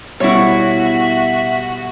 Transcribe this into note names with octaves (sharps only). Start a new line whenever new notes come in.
B2 G3 E4 F#4 C#5 E5 C#6